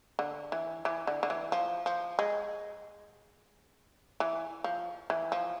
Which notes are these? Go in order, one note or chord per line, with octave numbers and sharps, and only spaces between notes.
D3
E3
E3
D3
D3
E3
F3
F3
G#3
E3
F3
E3
F3